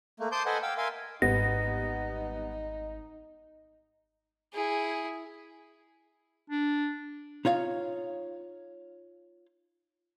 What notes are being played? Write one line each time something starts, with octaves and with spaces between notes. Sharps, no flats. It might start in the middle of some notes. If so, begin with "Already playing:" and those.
A3 A#3
C5 A5 C6 D6 D#6 G6
A4 B4 C5 D#5 F#5 G#5
F5 G5 E6
A#4 E5 F5 G#5 C6
G#1 G3 B3 D#4 A#6
E4 G#4
D4
D#4 F4 C#5 F5